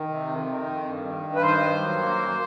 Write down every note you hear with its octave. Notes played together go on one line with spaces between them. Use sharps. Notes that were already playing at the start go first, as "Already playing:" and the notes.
Already playing: D#3
C3
F2
D#3
F2
G2
D#3
G2
B4
D#3 C5
G2
F#3
A#3
F#2